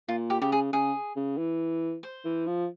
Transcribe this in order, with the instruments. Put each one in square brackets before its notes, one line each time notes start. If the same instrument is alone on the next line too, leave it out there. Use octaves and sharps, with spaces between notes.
[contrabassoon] A#2 [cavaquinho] F4
[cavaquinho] G4
[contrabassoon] C#3 [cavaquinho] G4
[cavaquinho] G#4
[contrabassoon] C#3 [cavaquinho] G#4
[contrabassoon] C#3
E3
[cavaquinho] C5
[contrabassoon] E3
F3